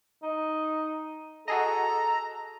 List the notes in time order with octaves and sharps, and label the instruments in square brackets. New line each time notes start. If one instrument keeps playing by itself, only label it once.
[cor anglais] D#4
[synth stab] F#4 G#4 D#5 [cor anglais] A4 [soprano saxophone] A#5